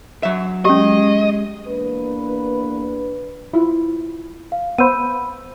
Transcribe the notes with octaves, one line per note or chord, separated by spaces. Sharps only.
F#3 E5
G#3 C#4 G4 D#5
E2 A#3 D4 B4
E4 F4
F5
B3 C5 B5 E6 D#7